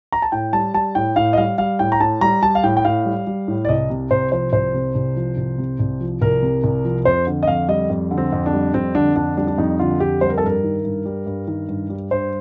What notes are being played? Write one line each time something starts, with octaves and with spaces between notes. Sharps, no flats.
A#5
A5
A2 G5
G3 A5
G3 A5
A2 G5
A2 F5
D#5
G3 F5
G3 F5
A2 G5
A#5
A2 A5
G3 A#5
G3 A5
F5
A2 G5
G5
A2 F5
G3
G3
A2
D5
C2 D#5
C3
C2 C5
F3 C5
C2 C5
C3
C2
F3
C2
C3
C2
F3
C2 A#4
C3
C2
F3
F2 C5
D3
D#5
F2 F5
G3 D#5
F2
D3
C4
F2
D4
G3
F2 C4
D3 D4
F2 D4
G3 D4
D4
F2 D#4
D3 F4
F2 G4
G3 C5
A#4
A4
G2 A#4
D#3
G2
G3
G2
D#3
G2
G3
G2 C5